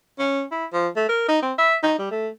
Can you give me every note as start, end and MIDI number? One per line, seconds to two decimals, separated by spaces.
0.19 0.42 61
0.52 0.65 64
0.73 0.88 53
0.96 1.07 57
1.09 1.25 70
1.28 1.40 63
1.42 1.53 60
1.58 1.76 76
1.83 1.95 63
1.98 2.09 55
2.11 2.28 57